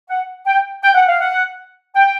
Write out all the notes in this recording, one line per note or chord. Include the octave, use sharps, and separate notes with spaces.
F#5
G5
G5
F#5
F5
F#5
G5